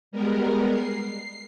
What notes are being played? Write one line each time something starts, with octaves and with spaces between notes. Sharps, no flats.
G3 G#3 B3 A#4
C7